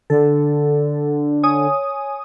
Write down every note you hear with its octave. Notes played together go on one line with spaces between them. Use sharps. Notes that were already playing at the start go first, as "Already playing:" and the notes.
D3 A4
C#5 G#5 D#6